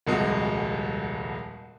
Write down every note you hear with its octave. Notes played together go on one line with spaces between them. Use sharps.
D#1 C2 F2 G#3 F#4 D#6